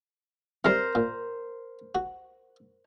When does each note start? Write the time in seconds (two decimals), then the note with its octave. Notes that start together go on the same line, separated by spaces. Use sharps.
0.65 C3 G3 A#4 C5
0.95 A#2
1.95 F#4